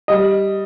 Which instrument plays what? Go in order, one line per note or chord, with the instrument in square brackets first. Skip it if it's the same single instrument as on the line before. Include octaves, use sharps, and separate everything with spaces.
[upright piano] G3 D#5